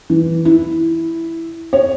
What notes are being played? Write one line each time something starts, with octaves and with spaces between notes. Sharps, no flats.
E3
E4
C#5